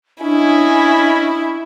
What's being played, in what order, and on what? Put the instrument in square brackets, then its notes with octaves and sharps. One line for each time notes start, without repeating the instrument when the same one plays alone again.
[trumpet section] C#4 D#5 G#5 [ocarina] D4 [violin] E4